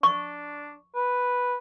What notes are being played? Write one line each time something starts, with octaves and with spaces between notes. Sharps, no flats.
D4 C#6
B4